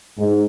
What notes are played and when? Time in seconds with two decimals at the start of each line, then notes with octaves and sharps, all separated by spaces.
0.18 G#2